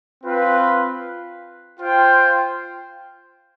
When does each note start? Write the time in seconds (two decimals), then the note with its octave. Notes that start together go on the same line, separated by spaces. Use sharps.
0.24 C4 F4 B4 F5
1.79 F4 C5 G5